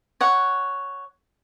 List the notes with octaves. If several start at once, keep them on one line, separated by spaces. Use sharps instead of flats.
C#5 F#5